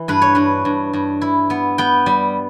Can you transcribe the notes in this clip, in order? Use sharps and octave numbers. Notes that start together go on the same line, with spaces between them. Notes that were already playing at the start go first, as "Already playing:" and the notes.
Already playing: E3
G2 B4
C#5
G2 B4
G2
G2
E4
B3
B3 G5
G3